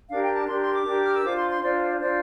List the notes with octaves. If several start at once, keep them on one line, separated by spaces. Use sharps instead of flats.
D4 G4 A#4 F5
G5
A5
D4 G4 A#4 C6
C6
D6
D4 G4 A#4
F6
E6
D4 F4 C5 D6
C6
C6
D4 F4 C5 D5
D4 F4 C5 D5